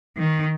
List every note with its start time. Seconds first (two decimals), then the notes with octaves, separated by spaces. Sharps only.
0.17 D#3